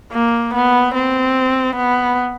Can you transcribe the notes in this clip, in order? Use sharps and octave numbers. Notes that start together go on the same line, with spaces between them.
A#3
B3
C4
B3